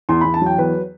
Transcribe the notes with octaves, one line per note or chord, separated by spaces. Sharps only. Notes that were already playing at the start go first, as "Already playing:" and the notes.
E2 C6
E2 B5
A5
F#3 G5
E2 B4